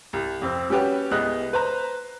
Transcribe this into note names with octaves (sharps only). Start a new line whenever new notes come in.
C2
F2 C4
G3 C#4 F#4 G4 B4
C2 G#3 B3 D#5 F#6
B4 C5 A#5